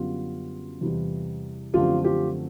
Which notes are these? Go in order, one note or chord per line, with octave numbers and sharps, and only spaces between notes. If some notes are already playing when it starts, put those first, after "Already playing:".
Already playing: F#2 D3 G3 B3 F4
E2 C3 E3 G3
F#2 D3 F3 A3 C4 F4 G4
F4 G4